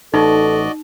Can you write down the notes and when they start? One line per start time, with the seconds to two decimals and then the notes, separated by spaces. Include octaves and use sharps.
0.14 A1 D#4 F#4 A4 D5 D#5